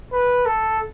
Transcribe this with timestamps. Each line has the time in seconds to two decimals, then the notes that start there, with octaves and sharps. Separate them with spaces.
0.12 B4
0.46 A4